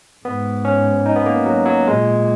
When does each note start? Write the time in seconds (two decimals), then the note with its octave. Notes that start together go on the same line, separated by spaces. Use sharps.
0.25 G#2 B3
0.65 C#4
1.06 D#4
1.16 B3
1.26 A#3
1.46 F#3
1.66 F#3
1.86 A#2 G#3